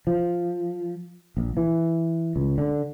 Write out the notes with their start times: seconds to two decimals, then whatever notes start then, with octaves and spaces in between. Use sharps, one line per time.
0.07 F3
1.37 A#1
1.57 E3
2.36 C#2
2.58 D3